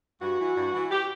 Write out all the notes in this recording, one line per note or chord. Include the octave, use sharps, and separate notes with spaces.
G2 F#4
E3
G2
E3
G4